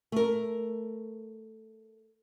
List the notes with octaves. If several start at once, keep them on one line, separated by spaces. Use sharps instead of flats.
A3 A#4